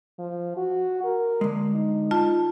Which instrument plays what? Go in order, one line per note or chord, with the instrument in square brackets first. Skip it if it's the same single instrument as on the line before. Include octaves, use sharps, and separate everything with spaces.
[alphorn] F3
F#4
A#4
[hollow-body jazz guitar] D3 G#3
[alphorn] D#4
[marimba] F4 [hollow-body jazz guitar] A5